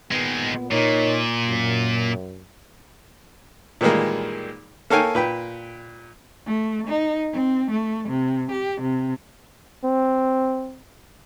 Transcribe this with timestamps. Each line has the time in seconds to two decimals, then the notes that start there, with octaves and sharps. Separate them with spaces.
0.12 A#2 D#3 G#3 B3
0.71 A#2 D#4 A#4 C#5
1.47 F#2
3.81 A#2 D#3 E3 G3 G#3 A#3
4.90 A#3 A4 C#5 F5 G5 G#5
5.15 A#2 B4 G5
6.46 A3
6.87 D#4
7.33 C4
7.70 A3
8.08 C3
8.51 G4
8.81 C3
9.84 C4